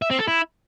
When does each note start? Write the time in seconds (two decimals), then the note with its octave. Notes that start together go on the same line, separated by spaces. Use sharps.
0.02 E5
0.11 C4
0.19 A4
0.28 E4